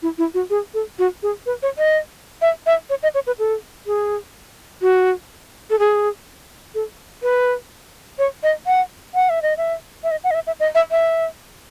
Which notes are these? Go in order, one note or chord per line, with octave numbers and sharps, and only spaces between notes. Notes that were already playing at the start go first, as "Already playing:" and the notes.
E4
E4
F#4
G#4
A4
F#4
G#4
B4
C#5
D#5
E5
E5
C#5
D#5
C#5
B4
A4
G#4
F#4
A4
G#4
A4
B4
C#5
D#5
F#5
F#5
E5
D#5
E5
E5
D#5
F#5
D#5
E5
E5
D#5
E5
E5